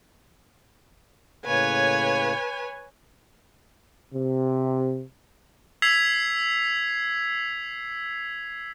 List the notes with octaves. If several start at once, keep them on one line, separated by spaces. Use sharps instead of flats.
A2 C#3 A#3 B4 C#5 G#5
C3
E6 G#6 B6 C7 F7